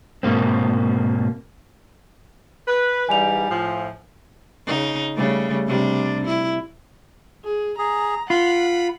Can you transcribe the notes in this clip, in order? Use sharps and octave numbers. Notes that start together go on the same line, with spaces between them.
G#2 B2 A#3 C4
B4
G#2 E3 G3 G#5 F7
A2 F3
C#3 D#4
C#3 G3 A3
C3 G3 D4
E4
G#4
G#4 A#5
F4 F#5 B5